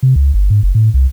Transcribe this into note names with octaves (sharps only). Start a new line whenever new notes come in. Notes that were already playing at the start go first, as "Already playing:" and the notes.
C3
C#2
G1
G#2
F#1
A2
C2